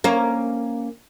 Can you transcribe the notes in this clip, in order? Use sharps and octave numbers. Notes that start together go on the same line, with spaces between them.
A#3 C#4